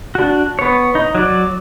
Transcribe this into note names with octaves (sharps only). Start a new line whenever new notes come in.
D4 F#4
B3 C#5
D#4
F#3 D5